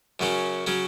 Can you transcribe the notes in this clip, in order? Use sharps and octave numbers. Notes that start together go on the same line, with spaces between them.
F#2 C#3 F#3 C#4
C#3 F#3 C#4